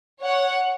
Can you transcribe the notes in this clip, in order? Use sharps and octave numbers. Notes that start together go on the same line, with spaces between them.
C#5 F#5